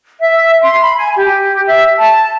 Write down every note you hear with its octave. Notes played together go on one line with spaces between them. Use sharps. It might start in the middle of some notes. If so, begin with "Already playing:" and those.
E5
C6
B5
G#5
G4
E5
A5